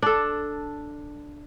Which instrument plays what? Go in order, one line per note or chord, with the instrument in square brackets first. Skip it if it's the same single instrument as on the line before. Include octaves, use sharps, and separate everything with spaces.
[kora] D4 A4